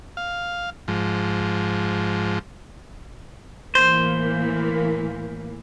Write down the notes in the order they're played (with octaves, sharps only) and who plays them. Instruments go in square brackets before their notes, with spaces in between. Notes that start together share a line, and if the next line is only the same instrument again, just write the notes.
[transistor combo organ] F5
G#2 F3
[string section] A2 E3 A#3 [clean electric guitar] C5